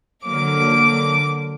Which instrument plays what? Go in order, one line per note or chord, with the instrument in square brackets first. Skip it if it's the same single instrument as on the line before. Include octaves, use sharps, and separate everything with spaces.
[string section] D3 F#3 A#3 D6